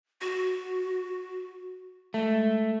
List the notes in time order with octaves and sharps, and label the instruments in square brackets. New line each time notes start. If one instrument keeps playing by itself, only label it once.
[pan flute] F#4
[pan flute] G#3 [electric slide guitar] A3